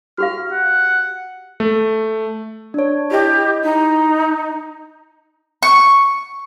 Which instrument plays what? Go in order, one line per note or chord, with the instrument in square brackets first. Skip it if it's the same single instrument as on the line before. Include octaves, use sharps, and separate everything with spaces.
[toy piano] F#4 G4 F5 [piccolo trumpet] F6
[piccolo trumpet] F#5
[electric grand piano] A3
[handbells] D4 C#5
[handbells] E4 D#5 [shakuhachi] G4
[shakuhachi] D#4
[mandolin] C#6